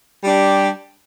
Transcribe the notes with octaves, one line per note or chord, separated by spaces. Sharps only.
G3 D4 G4